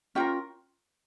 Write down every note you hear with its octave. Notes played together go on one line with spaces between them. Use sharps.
C#4 F4 A#4 G5